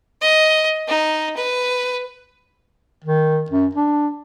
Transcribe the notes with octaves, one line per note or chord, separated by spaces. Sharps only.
D#5
D#4
B4
D#3
F#2
D4